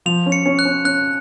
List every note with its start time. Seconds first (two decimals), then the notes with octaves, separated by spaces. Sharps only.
0.06 F3 F7
0.26 C#4
0.32 C#7
0.46 C#4
0.59 F#6
0.65 C#4
0.85 C#4 F#6